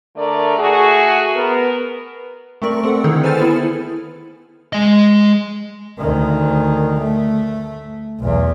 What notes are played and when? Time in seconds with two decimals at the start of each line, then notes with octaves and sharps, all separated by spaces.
0.16 D3 A3 A#4 D5
0.57 A3 F#4 G#4
1.36 B3 A#4
2.62 A3 C4 A#4 D5 C#6
2.84 C4 A4 F#5
3.04 D3 D#3 D#4 E4 G#4 A4
3.23 B4 C5 G#5 F6 A6
3.41 B3 E4 A4
4.73 G#3 D#5
5.99 D2 D#3
7.00 A3
8.20 B1 E2